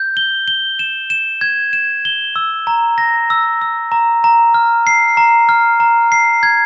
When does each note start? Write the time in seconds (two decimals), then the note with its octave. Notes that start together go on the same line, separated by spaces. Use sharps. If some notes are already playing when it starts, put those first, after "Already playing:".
Already playing: G6
0.17 G7
0.48 G7
0.79 E7
1.10 E7
1.41 G#6
1.73 E7
2.05 G7
2.36 E6
2.67 A#5
2.98 A#6
3.30 E6
3.61 E6
3.92 A#5
4.24 A#5
4.54 F6
4.87 C7
5.17 A#5
5.49 F6
5.80 A#5
6.12 C7
6.43 G#6